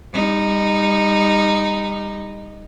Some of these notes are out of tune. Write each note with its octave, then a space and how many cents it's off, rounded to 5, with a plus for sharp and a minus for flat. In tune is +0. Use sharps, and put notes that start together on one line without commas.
G3 +30 D#4 -10